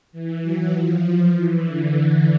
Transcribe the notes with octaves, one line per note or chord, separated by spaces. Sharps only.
E3
F#3
F3
E3
D3